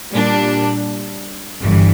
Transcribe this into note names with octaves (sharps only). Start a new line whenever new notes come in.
A#2 G3 D4
G1 G2 E3